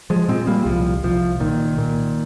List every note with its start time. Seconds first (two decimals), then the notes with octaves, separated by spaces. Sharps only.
0.10 F3 G#3
0.28 A#2 G#3 C4
0.47 G3 A#3
0.66 C2 F3
1.04 C2 F3
1.40 A#2 D#3
1.78 A#2